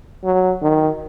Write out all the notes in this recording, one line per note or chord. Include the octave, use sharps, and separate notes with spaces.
F#3
D#3